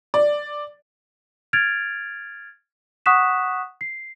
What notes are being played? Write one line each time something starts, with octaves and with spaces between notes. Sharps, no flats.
D5
F6 G#6 A6 D7 F7
F#5 C#6 D#6 F#6 B6 E7
C7